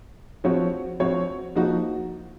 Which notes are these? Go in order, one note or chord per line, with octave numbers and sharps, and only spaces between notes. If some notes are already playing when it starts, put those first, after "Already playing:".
F3 C4 F#4 C#5
F3 C4 F#4 C#5
F3 A#3 D#4 F#4